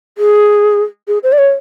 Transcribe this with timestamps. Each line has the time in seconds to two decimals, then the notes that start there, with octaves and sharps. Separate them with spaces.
0.18 G#4
1.08 G#4
1.23 C5
1.32 D5
1.38 C#5